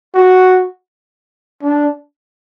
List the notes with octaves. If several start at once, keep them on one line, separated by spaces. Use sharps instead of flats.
F#4
D4